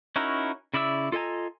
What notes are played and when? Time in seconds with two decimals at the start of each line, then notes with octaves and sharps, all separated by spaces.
0.16 C#4 D#4 E4 F#4 A#4
0.74 C#3 E4 D5 E5 E6
1.12 F4 A4 D#5 G#5 A#5